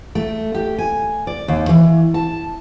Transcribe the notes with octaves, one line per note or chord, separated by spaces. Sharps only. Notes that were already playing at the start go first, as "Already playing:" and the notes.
A3
G4
G#5
D5
D#2
E3
A5